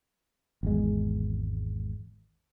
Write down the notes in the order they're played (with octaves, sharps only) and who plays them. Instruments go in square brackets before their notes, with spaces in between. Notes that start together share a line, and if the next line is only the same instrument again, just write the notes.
[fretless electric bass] G#1 E2 G#3